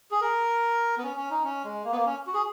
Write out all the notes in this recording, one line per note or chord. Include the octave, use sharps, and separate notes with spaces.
G#4
A#4
B3
C#4
C#4
D#4
C#4
G#3
A#3
B3
A#3
C#4
F#4
G#4